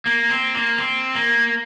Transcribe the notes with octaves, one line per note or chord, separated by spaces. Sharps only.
A#3
C4
A#3
C4
A#3